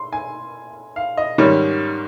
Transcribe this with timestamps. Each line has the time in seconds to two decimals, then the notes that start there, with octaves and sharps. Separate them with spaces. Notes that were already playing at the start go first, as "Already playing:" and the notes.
Already playing: C6
0.13 G#5
0.96 F5
1.17 D#5
1.38 G#2 D#3 G3 C#4 C#5